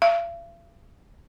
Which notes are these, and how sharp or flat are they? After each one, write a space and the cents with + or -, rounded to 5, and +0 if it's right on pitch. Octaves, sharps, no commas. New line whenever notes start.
F5 -45